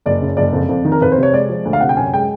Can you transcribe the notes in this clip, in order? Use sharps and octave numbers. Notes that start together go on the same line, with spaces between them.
F#1 D5
C#3
F#1 D5
F2
F2
D#3
A#4
F2 B4
C5
C3
C#5
G#3 D5
F3
D2
F5
C3 F#5
G5
F#2 G#5
G#3 G5